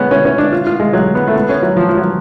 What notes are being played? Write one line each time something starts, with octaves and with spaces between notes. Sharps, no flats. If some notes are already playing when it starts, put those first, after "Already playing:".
Already playing: G#3 B3 C#4
C#4
C#4
D4
F4
F4
G#3
F#3
B3
A3
B3
C#4
F#3
F3
F3
F#3